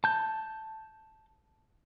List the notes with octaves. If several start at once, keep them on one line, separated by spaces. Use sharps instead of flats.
A5 G6